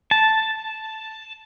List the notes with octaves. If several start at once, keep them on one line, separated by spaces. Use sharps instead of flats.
A5